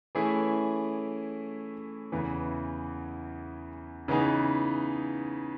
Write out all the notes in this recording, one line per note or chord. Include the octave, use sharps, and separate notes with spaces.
E3 A3 C#4 E4 G#4
E2 C#3 E3
C#3 E3 B3 D#4 G#4